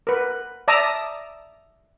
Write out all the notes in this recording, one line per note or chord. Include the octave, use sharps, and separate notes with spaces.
A#4 B4
D5 E5 A5 A#5 D6 D#6